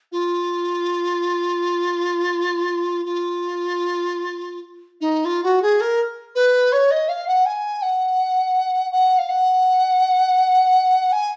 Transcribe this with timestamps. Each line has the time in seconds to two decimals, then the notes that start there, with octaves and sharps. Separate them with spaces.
0.12 F4
3.05 F4
5.01 D#4
5.25 F4
5.43 F#4
5.62 G#4
5.80 A#4
6.35 B4
6.72 C#5
6.91 D#5
7.08 F5
7.27 F#5
7.45 G#5
7.82 F#5
8.92 F#5
9.18 F5
9.29 F#5
11.12 G#5